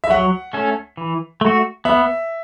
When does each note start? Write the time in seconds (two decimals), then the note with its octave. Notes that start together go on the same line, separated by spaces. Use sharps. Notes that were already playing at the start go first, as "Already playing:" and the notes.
0.04 E5
0.10 F#3 F#5
0.53 A3 C#4 A4
0.97 E3
1.41 A3 F#4
1.85 B3 E5